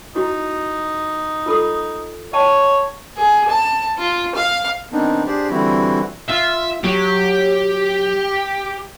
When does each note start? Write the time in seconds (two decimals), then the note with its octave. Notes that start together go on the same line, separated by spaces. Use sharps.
0.15 D#4 E4 F#4
1.46 F4 A4 D#6
2.33 C#5 D#5 G5 A5
3.17 G#4
3.50 A5
3.98 F4
4.35 F5
4.92 D#3 B3 C4 D4 D#4
5.27 D4 G4 G#4 C5 D5
5.50 D3 E3 G3 C4 E4 F#4
6.29 F4 E5
6.84 F#3 G4